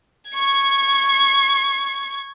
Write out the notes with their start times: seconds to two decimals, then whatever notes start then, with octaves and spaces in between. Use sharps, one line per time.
0.31 C#6 G#6